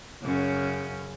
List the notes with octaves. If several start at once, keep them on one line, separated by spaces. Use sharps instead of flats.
F#2 C#3 C#4